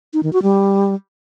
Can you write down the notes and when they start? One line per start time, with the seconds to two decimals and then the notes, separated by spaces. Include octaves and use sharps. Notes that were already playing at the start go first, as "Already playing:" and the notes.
0.13 D#4
0.23 D#3
0.33 F#4
0.43 G3